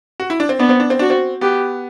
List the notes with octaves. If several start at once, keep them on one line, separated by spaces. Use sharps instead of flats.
F#4
E4
D4
C4
B3 D4
C4
D4
C4
D4 F#4
C4
B3 G4